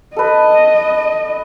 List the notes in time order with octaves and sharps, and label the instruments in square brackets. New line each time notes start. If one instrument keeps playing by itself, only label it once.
[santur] A4 B4 [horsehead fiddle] D#5